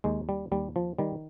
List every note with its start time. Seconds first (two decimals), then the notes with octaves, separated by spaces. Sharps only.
0.04 D#2 G#3
0.29 G3
0.52 D#2 G3
0.76 F3
0.99 D#3 G3